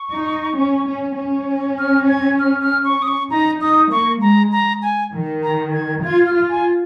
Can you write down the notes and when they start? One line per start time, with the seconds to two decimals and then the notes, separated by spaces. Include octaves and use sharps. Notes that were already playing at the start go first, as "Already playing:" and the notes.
Already playing: C#6
0.12 D#4
0.57 C#4
0.87 C#4
1.18 C#4
1.79 F6
2.09 G#6
2.39 F6
2.62 F6
2.85 C#6
3.02 D#6
3.08 C#6
3.30 D#4 A#5
3.60 D#4 D#6
3.91 A#3 C#6
4.21 G#3 A#5
4.52 A#5
4.82 G#5
5.13 D#3
5.43 A#5
5.73 G#6
6.03 F4 G#6
6.26 F6
6.34 F4
6.49 G#5